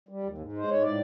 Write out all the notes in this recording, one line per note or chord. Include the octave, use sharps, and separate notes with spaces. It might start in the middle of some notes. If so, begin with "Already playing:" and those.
G3
D#2
G#2
G#3
C5
G#2 C#5
A2 D5